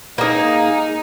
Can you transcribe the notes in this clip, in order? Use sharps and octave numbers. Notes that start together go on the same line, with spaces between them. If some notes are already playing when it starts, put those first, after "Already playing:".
A#3 D#4 G#4